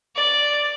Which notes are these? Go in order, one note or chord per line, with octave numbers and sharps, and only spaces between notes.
D5